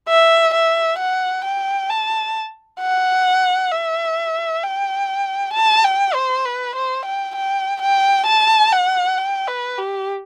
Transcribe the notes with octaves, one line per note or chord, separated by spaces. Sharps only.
E5
E5
F#5
G5
A5
F#5
E5
G5
A5
G5
C5
B4
C5
G5
G5
G5
A5
F#5
G5
B4
G4